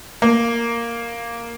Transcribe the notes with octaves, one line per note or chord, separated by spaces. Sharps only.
A#3